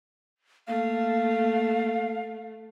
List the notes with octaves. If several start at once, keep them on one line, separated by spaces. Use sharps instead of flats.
A3 A#3 F5